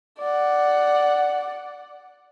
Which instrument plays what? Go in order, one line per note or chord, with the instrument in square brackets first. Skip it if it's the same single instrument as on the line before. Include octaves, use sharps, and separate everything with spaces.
[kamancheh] D5 F#5